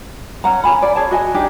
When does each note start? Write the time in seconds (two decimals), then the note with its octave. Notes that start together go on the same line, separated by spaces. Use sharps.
0.44 C#4 F#5 A#5
0.64 C#4 G#4 G#5 B5
0.82 D5
0.96 G#4 C#5 A5
1.11 F#4 D#5 G#5
1.34 D4 D#4 G4